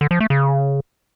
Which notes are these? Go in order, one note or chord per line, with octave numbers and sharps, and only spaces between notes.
D3
F3
A3
C#3